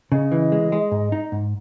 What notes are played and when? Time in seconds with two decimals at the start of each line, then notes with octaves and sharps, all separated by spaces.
0.12 C#3 D#5
0.32 E3
0.52 G#3
0.72 G#3
0.92 G#2
1.12 D#4
1.32 G#2